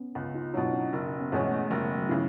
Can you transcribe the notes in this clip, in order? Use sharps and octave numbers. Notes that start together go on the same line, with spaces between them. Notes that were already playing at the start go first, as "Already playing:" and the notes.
Already playing: B3 C#4
C#2
D#4 F4
B2 F#3 D4 E4
C#4 D#4
F#1
B3 C#4
E2 B2 G#3 C#4
A3 B3
F#1 F3 G3
F#3
C#3 E3